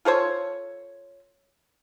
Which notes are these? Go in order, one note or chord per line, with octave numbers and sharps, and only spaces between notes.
F4 A4 C5 C#5